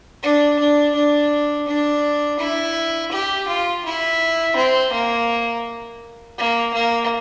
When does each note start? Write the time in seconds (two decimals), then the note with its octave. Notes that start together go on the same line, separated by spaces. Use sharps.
0.23 D4
0.59 D4
0.95 D4
1.68 D4
2.39 E4
3.12 G4
3.48 F4
3.85 E4
4.56 C4
4.93 A#3
6.38 A#3
6.74 A#3